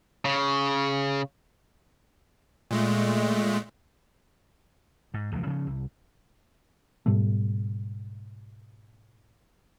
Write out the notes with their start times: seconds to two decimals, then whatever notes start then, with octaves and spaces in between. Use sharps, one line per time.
0.25 C#3
2.71 A#2 G#3 A3
5.14 G#2
5.32 D#1 C#2 C3 F3
5.46 C#3 F3 G3 C#4
5.67 C2
7.06 G#2 B2 G3 A3